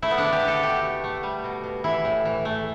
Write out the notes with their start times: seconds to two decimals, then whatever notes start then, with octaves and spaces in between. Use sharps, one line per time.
0.02 A3 E4
0.11 B3
0.18 D3 D4
0.33 G4
0.42 D3
0.48 A4
0.63 B2 G4
0.83 A3
1.04 A3
1.23 G3
1.44 B2
1.64 B2
1.84 E3 E4
2.05 A2
2.25 E3
2.45 A3